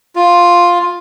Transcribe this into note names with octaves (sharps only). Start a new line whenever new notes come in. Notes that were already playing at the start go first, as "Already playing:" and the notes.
F4